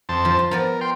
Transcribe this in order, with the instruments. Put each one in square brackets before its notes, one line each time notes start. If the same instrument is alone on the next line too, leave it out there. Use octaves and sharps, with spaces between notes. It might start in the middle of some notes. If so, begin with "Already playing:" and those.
[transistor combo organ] F2 C5 A5
[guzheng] F3
F4
[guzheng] F3 B3 D5 [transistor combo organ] A#4
[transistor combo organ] G5 C6